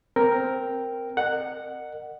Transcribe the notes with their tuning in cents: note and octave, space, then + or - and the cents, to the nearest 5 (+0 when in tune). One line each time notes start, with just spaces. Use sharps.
C4 +0 A#4 +0 G5 +0
A#4 -25 D#5 -40 F#5 +0